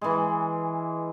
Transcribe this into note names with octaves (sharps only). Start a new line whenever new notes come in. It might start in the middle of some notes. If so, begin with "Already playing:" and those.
E3 G#3